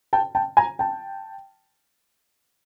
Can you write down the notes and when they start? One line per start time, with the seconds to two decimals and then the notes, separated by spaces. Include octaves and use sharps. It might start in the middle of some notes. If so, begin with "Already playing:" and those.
0.13 G5 A5
0.35 G5 A5
0.57 G#5 A#5
0.79 G5 A5